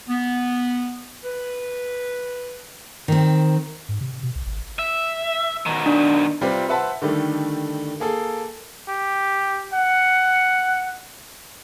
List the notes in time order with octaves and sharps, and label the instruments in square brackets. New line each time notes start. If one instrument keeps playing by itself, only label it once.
[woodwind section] B3
B4
[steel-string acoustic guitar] D#3 C4
[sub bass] G#2
C3
B2
C2
G#1
[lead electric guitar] E5
B2 D#3
[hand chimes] D4 D5
[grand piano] C3 G3 C4 F4 B4
B4 C5 E5 F#5 A5 B5
D3 D#3 G3 A3
A#3 G#4 A4
[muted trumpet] G4
F#5